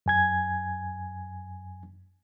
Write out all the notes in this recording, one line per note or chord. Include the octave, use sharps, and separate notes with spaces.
F#2 G#5 G#6